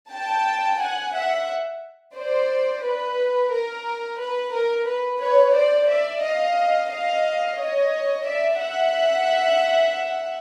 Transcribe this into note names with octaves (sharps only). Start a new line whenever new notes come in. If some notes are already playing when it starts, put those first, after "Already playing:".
G5 A5
F#5 G#5
E5 F#5
C5 D5
B4
A#4
B4
A#4
B4
B4 C#5
C5 D5
D5 E5
D#5 F5
D#5 F5
C#5 D#5
D5 E5
E5 F#5